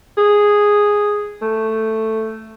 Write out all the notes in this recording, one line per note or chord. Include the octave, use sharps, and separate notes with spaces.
G#4
A3